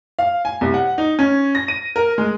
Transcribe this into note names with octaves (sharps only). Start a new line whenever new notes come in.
F5
G#5
C2
F#5
D#4
C#4
A#6
D#7
A#4
G#3